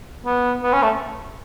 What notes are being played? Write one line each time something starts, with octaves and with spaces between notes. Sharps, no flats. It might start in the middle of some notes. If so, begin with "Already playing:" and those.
B3
B3
C#4
A3